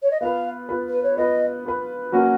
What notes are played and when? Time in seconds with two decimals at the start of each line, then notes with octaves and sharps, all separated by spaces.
0.02 C#5
0.11 D#5
0.21 B3 F4 B4 F5
0.69 B3 F4 B4
0.88 B4
1.03 C#5
1.17 B3 F4 B4 D#5
1.65 B3 F4 B4
2.12 F#3 A#3 C#4 F#4 F#5